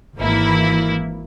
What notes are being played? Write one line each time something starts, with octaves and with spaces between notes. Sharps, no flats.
G#1 E3 A#3 E4